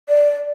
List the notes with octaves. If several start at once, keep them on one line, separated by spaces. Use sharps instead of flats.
D5